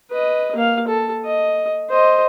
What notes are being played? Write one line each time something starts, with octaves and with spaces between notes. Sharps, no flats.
B4 D#5
A#3 F5
A4
D#5
C5 D#5